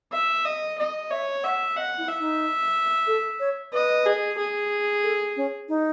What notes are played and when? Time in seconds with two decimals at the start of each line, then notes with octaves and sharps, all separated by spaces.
0.12 E5
0.45 D#5
0.78 D#5
1.11 C#5 E5
1.43 E5 F#5
1.76 D#5 F#5
1.98 E4
2.08 E5
2.20 D#4
3.07 A4
3.40 C#5
3.73 B4 D#5
4.05 G#4
4.38 G#4
5.03 A4
5.36 C#4
5.68 D#4